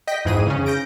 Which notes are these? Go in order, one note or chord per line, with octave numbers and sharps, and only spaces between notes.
D#5 G5 B6
F2 G#2 E3 G#4 D#7
C#3 C#4
G6 A#6 D7